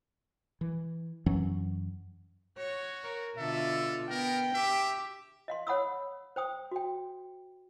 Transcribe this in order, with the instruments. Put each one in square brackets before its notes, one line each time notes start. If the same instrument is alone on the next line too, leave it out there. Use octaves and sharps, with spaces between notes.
[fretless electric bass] E3
F#2 E3 F#3 C#4
[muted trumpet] F#4 [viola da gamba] C#5
[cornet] A#4
[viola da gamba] B2 D3 F4 [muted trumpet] A4 [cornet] E5
[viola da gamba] B3 [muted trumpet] A#4 [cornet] G5
[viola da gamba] G4 [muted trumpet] E5
[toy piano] D#5 F5 C6
C#5 F#5 B5 D#6 E6
C5 G5 D#6
F#4 G5